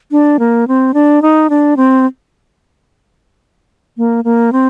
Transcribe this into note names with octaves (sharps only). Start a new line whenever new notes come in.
D4
A#3
C4
D4
D#4
D4
C4
A#3
A#3
C4